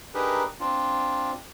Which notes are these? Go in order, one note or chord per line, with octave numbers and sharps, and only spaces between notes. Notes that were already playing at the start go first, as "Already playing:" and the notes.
D4 D#4 G4 G#4 A#4 B4
C4 D4 F4